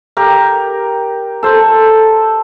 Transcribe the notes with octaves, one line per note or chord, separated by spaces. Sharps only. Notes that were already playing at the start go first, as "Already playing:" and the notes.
G4 A#4
A4 C5